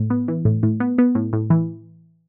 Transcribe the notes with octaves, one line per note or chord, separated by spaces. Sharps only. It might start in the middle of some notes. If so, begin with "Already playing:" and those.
Already playing: A2
B3
E3
A2
A2
B3
B3
A2
A2
E3